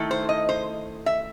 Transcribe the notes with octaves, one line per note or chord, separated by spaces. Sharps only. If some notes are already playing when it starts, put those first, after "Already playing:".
Already playing: D#3 A3 E4
C5
D#5
C5
E5